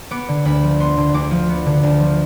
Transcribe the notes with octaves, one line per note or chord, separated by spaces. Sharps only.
B3 D6
D3
D2 B5
F3
B3 C6
D3
D2 D6
F3
B3
D3
D2
F3